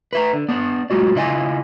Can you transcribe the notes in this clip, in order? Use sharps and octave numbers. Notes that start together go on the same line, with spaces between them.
B4 E5 A#5
D3
B3 D4 D5
A2 F#3 G#3 F4 F#4 D5
C#3 E4 F4 D#5 F5 G#5